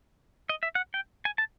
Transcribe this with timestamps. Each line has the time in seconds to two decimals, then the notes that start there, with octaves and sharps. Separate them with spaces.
0.49 D#5
0.63 E5
0.75 F#5
0.94 G5
1.25 G#5
1.38 A5